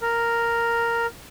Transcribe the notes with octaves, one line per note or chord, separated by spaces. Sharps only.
A#4